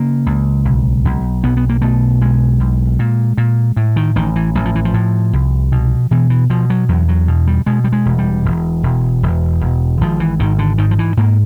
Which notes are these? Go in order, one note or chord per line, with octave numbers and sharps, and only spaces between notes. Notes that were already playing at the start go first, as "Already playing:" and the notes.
Already playing: C#3 A#3
C#2
B1
B1
B1 B3
B3
A#3
B2 A3
B1 G#3
B1
A#2
A#2
A2
D#3
A1 D#3
E3
A1 F#3
F3
E3
F3
A2
C2
B2
B2 E3
E3
B2 F3
F#3
E2 F#3
F#3
B2
G3
B2 G#3
G3
G#3
E1
G3
E1
E1
E1
E1
G#1 F3
E3
G#1 D#3
D3
G#2 D#3
F3
E3
G#2 A#3